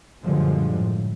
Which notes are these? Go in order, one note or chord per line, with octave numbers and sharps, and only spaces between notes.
F#2 A#2 D3 F3 G3 G#3
A2